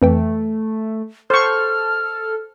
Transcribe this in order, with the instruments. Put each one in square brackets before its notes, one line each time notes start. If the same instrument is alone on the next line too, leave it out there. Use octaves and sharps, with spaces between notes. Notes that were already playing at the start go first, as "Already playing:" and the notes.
[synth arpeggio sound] F2 E3 G5 [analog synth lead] A3
[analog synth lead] A4 [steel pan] C5 C#6 [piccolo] F6